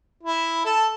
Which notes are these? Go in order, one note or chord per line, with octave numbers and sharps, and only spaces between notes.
E4
A4 A5